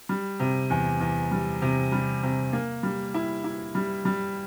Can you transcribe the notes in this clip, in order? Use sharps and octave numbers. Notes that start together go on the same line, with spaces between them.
G3
C3
E2
E2
G3
C3
G3
C3
A#3
G3
E4
E4
G3
G3